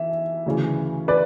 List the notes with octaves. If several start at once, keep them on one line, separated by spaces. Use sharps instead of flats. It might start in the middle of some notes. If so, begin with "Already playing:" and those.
Already playing: E3 E5
D2 C#3 E3
B4 D5